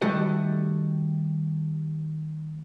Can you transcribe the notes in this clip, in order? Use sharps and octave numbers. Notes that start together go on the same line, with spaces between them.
D#3 G3 A3 F#4 A4 D#5